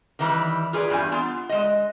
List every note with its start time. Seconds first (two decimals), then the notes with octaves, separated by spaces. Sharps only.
0.19 D#3 E3 G3 B4
0.73 F4 G#4 B4 D5
0.90 E2 G2 G3 G#5
1.12 B3 F4
1.49 G#3 D#5